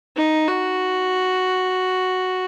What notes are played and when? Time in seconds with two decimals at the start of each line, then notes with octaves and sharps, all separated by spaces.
0.17 D#4
0.48 F#4